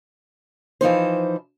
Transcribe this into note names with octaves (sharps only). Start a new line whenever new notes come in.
E3 F3 D#4 C5